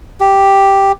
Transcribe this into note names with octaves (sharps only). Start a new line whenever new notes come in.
G4